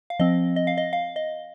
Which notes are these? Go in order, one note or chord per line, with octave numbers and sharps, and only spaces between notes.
F5
F3 C4 D#5
D#5
F5
D#5
F5
D#5